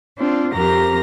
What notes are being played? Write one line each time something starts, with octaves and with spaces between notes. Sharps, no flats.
C4 D4 F4
F2 C4 G4 A#4 A#5 A#6